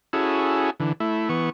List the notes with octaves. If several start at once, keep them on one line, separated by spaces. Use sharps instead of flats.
C#4 E4 F#4 G#4 A4
D3 E3
A3 E4
E3 B3 C#6